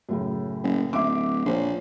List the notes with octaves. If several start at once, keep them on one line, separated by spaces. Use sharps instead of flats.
F#2 A2 C#3
F#1
D1 E5 D6
A#1 F4 C5 C#5